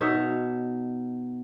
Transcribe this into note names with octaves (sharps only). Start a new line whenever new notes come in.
B2 D#4 C#5 E5